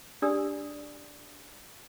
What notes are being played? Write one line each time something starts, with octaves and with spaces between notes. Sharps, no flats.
D4 G4 D5 G#5 D#6 E6